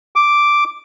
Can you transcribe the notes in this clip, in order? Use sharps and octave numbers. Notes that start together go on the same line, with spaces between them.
D6